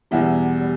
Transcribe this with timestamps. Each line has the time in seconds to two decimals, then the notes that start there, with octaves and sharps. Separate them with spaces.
0.11 E2 B2 G3 E4
0.60 G3